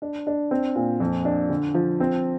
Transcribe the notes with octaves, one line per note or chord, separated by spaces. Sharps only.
D4
D4
C4
A#2
F2
D4
D3
F3
C4